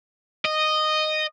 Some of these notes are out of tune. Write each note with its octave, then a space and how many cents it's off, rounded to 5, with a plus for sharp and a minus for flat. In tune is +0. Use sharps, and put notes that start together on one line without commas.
D#5 -10